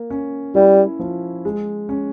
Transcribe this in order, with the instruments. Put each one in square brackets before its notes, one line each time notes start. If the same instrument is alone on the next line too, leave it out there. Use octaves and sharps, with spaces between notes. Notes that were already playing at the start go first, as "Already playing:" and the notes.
Already playing: [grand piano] A#3
C#4
[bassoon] G3 [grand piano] E4
[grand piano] F3
G#3
C#4